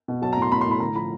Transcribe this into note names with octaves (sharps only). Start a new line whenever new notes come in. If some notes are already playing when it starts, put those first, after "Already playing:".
B2
F#3 A5
A#5
A2
C6
A2 B5
C6
A2
B5
D3 A#5
F3 B5